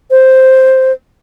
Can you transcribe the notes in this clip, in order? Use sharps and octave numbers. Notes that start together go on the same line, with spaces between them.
C5